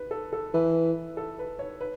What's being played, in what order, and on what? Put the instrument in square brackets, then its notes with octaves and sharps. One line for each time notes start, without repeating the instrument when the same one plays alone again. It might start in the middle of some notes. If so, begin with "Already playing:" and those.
Already playing: [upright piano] B4
A4
A4
[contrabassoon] E3 [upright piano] B4
[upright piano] A4
B4
C#5
B4